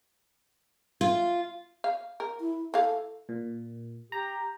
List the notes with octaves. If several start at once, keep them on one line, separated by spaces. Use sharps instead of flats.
F4
F5
A#4
E4
E3 A4 F5
A#2
G4 A#5